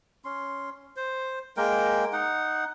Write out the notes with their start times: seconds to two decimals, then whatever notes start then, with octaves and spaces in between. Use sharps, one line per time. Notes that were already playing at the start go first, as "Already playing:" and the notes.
0.25 C#4 C6
0.96 C5
1.57 G#3 A#3 A#4 G5
2.13 D#4 F#5